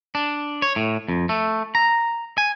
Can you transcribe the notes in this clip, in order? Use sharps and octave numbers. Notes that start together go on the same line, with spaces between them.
D4
C#5
A2
F2
A3
A#5
G#5